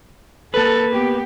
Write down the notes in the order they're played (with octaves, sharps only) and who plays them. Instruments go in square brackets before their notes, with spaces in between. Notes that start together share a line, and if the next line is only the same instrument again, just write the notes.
[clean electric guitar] A#3 B4 [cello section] A4
[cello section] B3 G4